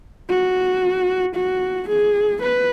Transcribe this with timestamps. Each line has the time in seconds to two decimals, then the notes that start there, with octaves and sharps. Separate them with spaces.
0.29 F#4
1.35 F#4
1.89 G#4
2.42 B4